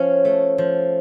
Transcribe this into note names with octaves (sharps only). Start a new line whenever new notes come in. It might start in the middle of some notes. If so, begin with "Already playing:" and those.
Already playing: F3 C#4 F5
A3
F3